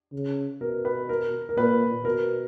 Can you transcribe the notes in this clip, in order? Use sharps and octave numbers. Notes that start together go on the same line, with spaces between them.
C#3
B2 A#4
B4
A#4
A#4
A#2 B4
B2 A#4